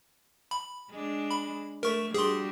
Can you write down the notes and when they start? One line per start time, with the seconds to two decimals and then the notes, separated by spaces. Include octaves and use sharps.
0.51 B5
0.90 G#3 D4
1.31 B5
1.83 A3 A#4 C#6
2.14 G3 D4 F#4 G#4 C6